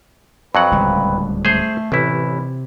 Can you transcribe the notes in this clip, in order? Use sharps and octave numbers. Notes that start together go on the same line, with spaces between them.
F2 F#3 B4 F#5
D1 C#2 G3
A3 G#4 C5
A1 C3 E3 E4